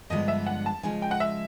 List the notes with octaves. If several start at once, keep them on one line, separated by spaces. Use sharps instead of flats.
G2 D3 F3 G#3 B3 D#5
E5
F#5
A5
C#3 F3 G#3 G#5
G5
F#5
E5